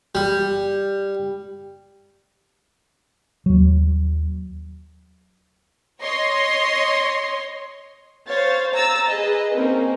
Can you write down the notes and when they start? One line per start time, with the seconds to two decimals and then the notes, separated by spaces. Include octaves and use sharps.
0.15 G3
3.46 D#2 F#3
6.02 C#5 D#5 C6
8.28 C5 C#5 F5 A6
8.74 A#5 E6 A6
9.10 G#4 B4 D#5
9.55 A#3 C4 C#4 D#4 A#4